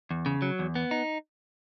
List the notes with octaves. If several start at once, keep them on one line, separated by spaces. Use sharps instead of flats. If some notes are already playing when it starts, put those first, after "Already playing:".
E2
C#3
F#3
E2
B3
D#4